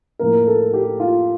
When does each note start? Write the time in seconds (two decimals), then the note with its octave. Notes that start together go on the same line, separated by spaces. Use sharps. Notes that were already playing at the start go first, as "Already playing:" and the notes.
0.19 A2 F3 A#3 A#4
0.47 A4
0.73 G4
1.00 F4